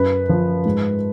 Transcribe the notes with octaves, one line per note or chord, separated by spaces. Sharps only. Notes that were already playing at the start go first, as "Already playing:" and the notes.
Already playing: F#2 B4
F3
G#2